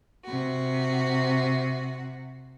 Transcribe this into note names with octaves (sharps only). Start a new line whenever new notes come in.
C3 F#4